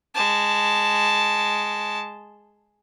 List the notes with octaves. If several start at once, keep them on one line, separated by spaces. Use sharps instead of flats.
G#3 A5